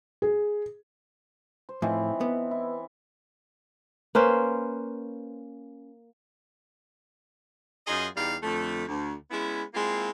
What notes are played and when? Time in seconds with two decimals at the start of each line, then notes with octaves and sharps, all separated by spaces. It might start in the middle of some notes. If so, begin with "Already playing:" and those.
0.22 G#4
1.69 C5
1.82 A2 E3 F3 C4 D#4
2.21 B3
2.51 E4
4.15 A#3 C#4 B4 C5
7.87 F#2 F4 G#4 D#5
8.16 E2 G3 D#4 G4 F5
8.43 F2 D3 A3
8.88 D2
9.31 G#3 B3 C#4 E4
9.74 G#3 A#3 C4 E4 F4